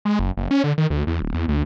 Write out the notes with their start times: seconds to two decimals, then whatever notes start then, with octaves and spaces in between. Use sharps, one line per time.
0.05 G#3
0.19 F#1
0.37 F#1
0.51 C#4
0.64 D3
0.78 D#3
0.90 D2
1.07 E2
1.22 D1
1.34 E2
1.48 D2